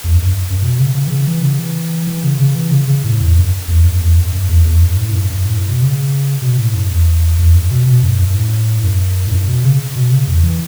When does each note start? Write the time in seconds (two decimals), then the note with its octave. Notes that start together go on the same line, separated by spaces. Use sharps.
0.04 E2
0.14 F#2
0.26 F#2
0.50 F#2
0.62 B2
0.79 C#3
0.94 C#3
1.07 E3
1.10 C#3
1.27 E3
1.43 C#3
1.59 E3
2.07 E3
2.24 C#3
2.40 C#3
2.55 E3
2.71 C#3
2.87 C#3
3.04 A2
3.20 E2
3.36 F#2
3.68 E2
3.84 F#2
4.00 E2
4.17 F#2
4.32 F#2
4.49 E2
4.65 E2
4.81 F#2
4.96 A2
5.09 A2
5.13 F#2
5.30 F#2
5.45 A2
5.57 F#2
5.69 B2
5.82 C#3
6.42 B2
6.57 A2
6.74 F#2
6.90 E2
7.39 E2
7.54 F#2
7.71 B2
7.86 B2
8.03 F#2
8.19 F#2
8.35 A2
8.83 F#2
9.27 A2
9.31 F#2
9.48 B2
9.64 C#3
9.95 B2
10.11 C#3
10.28 E2
10.44 E3